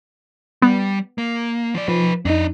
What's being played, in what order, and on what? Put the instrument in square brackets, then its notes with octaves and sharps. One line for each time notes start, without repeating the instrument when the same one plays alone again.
[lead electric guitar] G3 [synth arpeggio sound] B3
[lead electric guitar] A#3
F3 D5
[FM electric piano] F3 [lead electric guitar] D#4 B4
[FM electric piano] F2 D#4 [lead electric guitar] D4 D#5